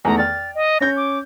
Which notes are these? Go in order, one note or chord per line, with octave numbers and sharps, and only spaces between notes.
E2 D#3 A3 A#5
D5 G5 F6 A6
D#5
C#4 C#5 G6 A#6
D6